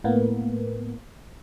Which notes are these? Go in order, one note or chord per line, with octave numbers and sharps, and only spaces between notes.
A2 A#3 B3